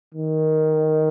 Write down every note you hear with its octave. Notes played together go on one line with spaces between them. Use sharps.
D#3